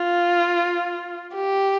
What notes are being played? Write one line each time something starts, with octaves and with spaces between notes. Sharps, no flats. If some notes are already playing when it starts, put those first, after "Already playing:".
Already playing: F4
G4